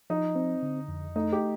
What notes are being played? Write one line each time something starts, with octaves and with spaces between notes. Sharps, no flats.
F3 D#4
C4
D3
F2
A3 D#4
G4